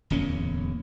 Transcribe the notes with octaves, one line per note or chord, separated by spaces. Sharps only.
D1 E2 A#3 C#4